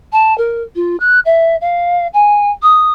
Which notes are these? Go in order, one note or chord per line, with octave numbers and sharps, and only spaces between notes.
A5
A#4
F4
F#6
E5
F5
G#5
D#6